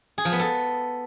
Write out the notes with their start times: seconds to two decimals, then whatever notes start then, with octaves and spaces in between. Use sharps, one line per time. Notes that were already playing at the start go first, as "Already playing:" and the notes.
0.18 G#4
0.25 F3
0.32 B3
0.40 A4